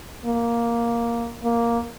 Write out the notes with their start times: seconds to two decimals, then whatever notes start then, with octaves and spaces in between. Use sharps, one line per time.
0.25 A#3
1.43 A#3